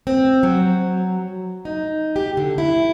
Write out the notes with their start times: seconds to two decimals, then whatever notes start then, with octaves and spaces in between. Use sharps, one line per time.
0.07 C4
0.43 F#3
1.65 D#4
2.16 G4
2.37 D3
2.58 E4